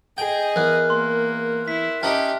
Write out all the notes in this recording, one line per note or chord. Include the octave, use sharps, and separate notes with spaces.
G#4 D#5 G5
E2 A#4 F6 F#6
A#3 C6
E4 B6
C#4 D#4 G4 E5 A5 F6